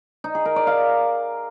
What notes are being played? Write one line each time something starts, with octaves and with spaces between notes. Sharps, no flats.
D#4
G#4
A#4
D5
F5